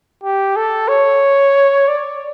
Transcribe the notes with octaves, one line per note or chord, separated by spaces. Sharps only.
G4
A4
C#5
D5